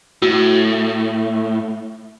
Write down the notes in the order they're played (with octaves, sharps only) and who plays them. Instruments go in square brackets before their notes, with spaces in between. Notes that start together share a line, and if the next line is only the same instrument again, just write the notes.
[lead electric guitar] A2 [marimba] F#4